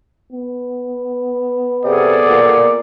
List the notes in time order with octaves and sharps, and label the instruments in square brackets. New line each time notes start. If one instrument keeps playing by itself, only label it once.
[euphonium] B3
[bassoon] C3 [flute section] G#4 A4 F#5 [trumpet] D5
[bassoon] A#2